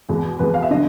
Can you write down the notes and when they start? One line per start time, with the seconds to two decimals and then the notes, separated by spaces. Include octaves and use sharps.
0.09 E2 B2 G#3
0.39 E2 B2 G#3 B4
0.54 F5
0.63 E5
0.71 D3 F#3 D#5